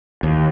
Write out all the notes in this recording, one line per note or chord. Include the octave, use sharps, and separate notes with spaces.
D#2